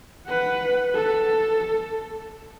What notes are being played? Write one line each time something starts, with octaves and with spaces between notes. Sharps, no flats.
B4 F#5
A4